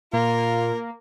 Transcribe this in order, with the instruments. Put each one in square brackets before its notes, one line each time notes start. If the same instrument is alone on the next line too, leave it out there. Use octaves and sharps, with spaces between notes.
[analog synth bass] A#2 [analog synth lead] A#3 [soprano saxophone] F4 [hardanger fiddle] A#4